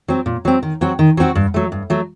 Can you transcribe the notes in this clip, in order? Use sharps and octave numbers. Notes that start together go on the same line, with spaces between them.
F#3 C4
A#2
F#3 C4
D#3
F#3 C4 F#4
D#3
F#3 C4 F#4
G2
F#3 A3
G2
F#3 A3